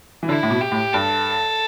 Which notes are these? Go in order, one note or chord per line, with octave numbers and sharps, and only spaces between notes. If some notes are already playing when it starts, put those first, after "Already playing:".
E3
D3 E4
A2
B2
G4
A2
G2 A4